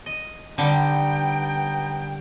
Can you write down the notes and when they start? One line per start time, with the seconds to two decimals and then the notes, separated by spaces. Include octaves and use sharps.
0.06 D#5
0.58 D3 G3 B3 D#4 G5